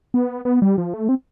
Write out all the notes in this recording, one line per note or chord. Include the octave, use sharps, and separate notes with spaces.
B3
B3
G3
F3
A3
C4